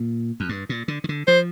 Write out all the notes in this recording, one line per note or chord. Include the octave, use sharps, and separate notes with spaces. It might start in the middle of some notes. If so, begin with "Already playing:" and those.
Already playing: A#2
F2
G2
A#2
D3
D#3
D3
F3 C5